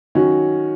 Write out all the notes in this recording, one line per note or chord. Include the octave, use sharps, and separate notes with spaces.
D#3 F#3 C#4 F#4